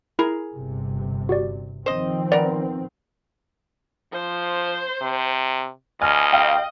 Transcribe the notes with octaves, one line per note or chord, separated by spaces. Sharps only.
E4 G#4 A#4
G1 C3
F#4 G4 D5
D#3 F3 C4 C5 D#5
B3 A#4 D5
F3 C5
C3
D2 D#5 G#5 F6
F5 G5